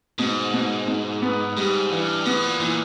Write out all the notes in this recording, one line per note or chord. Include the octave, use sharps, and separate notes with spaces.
G#2 B2
B2
B2
B3
G#2 G3
G2 E3
G#2 B3
A#2
A#2 E3